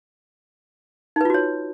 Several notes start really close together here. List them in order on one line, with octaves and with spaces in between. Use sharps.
D#4 B4 F4 F#4 C#5